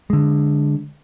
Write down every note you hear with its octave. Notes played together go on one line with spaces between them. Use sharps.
D3 G#3